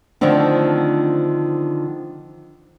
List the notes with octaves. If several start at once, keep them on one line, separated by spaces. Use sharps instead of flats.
D3 D#3 F3 A3 C4 D4